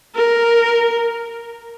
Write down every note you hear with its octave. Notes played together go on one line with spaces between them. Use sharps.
A#4